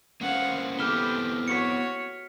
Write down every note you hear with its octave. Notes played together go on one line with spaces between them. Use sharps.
A#3 C#4 C5 F5 F#5
B3 C4 E4 G4 A4 F6 E7 G7
F#4 C#5 B6 C#7